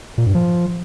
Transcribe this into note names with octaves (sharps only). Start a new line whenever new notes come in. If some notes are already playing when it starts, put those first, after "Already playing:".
A#2
G2
F3